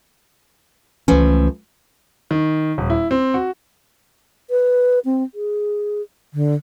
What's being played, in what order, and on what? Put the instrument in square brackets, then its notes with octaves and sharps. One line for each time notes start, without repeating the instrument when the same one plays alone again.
[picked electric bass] C#2 C#4 [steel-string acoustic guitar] E3 F3 A3
[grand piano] D#3
D#1
E4
C4
F#4
[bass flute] B4
C4
G#4
D3